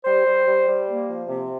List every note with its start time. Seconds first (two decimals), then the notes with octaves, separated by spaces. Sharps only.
0.05 G3 C5
0.25 G3
0.46 G3
0.67 G3
0.87 A#3
1.08 F3
1.28 C3